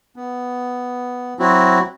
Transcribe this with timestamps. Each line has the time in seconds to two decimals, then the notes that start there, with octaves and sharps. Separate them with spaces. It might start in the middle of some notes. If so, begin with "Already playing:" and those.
0.16 B3
1.39 F#3 C4 E4 F#4